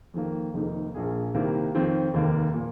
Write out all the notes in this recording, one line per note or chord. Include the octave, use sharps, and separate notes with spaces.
F2 D#3 A#3
F1 F2 D#3 A#3 D#4
A#1 A#2 A#3 G#4
C2 C3 D#3 A#3
F2 D#3 C4 F4
F1 D#2 D#3 A#3
A#2 F3 A#3